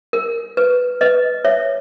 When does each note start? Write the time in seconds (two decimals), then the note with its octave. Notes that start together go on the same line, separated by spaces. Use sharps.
0.13 A#4
0.57 B4
1.01 B4 D#5
1.45 C#5 E5